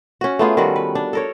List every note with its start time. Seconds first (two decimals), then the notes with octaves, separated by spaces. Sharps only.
0.21 C#4 F#4
0.39 A3 B3 F4 G#4
0.57 D#3 G3 F4 F#4
0.76 B4
0.95 D4
1.13 A4 A#4 C#5